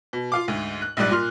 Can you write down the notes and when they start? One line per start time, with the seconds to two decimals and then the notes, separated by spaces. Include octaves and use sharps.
0.13 B2
0.32 F4 F5 D6
0.48 D2 G#2
0.82 F#6
0.97 A#1 G#2 G3 D5 F#6
1.11 A#2 C6 F6